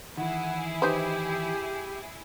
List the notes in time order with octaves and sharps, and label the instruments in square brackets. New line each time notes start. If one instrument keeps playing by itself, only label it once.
[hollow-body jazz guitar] D#3 E3 [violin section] E4 G#4 [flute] F#5
[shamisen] D#4 B4 C5 [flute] G4